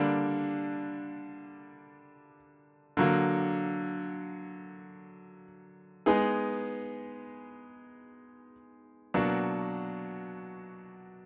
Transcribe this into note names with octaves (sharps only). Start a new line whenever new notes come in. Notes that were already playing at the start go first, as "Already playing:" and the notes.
Already playing: D3 G3 A#3 D4
D3 F#3 A#3
G#3 B3 D#4 G#4
B2 F#3 A#3 D4 F#4